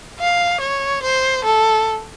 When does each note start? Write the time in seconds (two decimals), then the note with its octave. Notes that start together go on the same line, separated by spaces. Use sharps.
0.19 F5
0.61 C#5
1.03 C5
1.44 A4